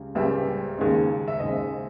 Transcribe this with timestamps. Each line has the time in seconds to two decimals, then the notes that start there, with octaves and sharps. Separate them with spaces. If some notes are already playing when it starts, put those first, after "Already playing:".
Already playing: C#2 C#3 G3
0.15 C#2 C#3 G3 E5
0.78 D#2 C#3 G#3
1.28 E5
1.39 D#2 C#3 G#3 D#5